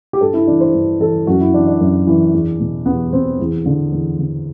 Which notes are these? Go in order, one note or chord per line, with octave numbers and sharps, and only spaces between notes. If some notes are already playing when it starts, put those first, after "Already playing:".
G4
G2 A4
E4
E3 D4
C5
G2
E3 A4
F#2 F#4
E4
E3 D4
D4
F#2
E3
E2
B2
E2 B3
B2 C4
E2
D3
E2
D3